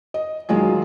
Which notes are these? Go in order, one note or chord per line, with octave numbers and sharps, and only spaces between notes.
D#5
E1 D#3 F#3 G#3 F4 G#4